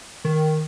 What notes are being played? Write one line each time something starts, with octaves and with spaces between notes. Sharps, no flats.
D#3